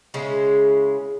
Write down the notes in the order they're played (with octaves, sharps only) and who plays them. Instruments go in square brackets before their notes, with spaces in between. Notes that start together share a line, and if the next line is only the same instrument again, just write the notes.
[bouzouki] C#3 G#3 C#4 E4